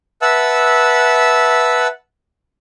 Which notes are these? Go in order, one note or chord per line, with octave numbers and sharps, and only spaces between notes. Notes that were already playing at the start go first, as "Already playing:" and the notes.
B4 E5 F#5 A5 E6